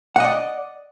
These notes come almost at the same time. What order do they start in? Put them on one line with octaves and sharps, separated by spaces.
F#5 D#5 D5